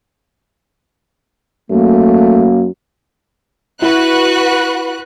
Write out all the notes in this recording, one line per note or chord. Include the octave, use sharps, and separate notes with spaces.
F#2 A3 A#3
E4 F#4 B4 F#6